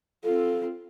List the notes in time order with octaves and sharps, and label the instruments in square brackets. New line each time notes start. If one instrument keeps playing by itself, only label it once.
[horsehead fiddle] C4 F4 [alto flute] A4